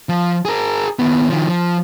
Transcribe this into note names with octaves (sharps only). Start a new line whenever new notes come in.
F3
G#4 A#4
D#2 B3
D#3 F3
F3